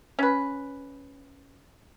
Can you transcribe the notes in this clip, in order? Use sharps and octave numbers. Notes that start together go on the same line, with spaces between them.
C#4 B4